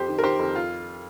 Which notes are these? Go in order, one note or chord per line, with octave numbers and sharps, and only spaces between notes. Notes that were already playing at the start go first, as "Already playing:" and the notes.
Already playing: F2 G4 C5
D#3
A#4
D#3 G4 C5
F2
F4